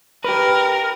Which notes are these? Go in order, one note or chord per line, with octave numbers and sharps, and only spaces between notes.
G4 A#4 B4